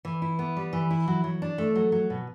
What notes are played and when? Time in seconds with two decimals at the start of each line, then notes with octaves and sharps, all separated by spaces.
0.05 E3
0.22 E4
0.39 B3
0.57 G3
0.73 E3
0.91 E4
1.08 F#3
1.24 F#3
1.42 D4
1.58 A3
1.75 F#3
1.92 F#3
2.10 B2